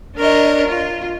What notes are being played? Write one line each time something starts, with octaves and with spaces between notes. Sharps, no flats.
D4 A#4 C#5 D#5
F4